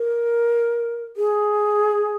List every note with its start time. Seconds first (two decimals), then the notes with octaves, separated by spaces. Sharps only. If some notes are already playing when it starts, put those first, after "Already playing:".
Already playing: A#4
1.17 G#4